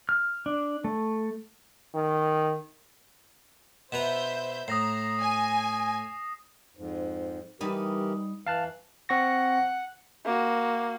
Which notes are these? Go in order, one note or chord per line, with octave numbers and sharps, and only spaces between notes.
F6
D4
A3
D#3
B2 B4 C5 E5 A#5 G6 E7
A2 A#5 D#6 A#6 C7
G#5
F2 G#2
E3 G3 D#4 G4 A#4 B4
E3 F5 A5 F#6
C4 F#5 C#6 A#6
A#3 F#4